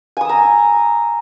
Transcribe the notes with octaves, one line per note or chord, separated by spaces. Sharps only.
G#5 A#5 D#6 E6